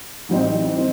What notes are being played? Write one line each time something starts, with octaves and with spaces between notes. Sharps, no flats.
A1 A2 G3 C4 D#4
C4 D#4